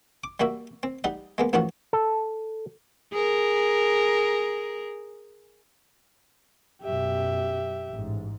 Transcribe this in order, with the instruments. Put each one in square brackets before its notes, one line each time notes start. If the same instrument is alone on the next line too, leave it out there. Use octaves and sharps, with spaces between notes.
[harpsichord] D6
G3 A#3 F#4 E5
C4
G3 D#4 F#5
G#3 A#3 B3
A1 G2 D#3 F3 F#4 F#5
[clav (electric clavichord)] A4
[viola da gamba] G#4 A#4
[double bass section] F#2 B2 [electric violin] G4 E5
[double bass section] A1 G#2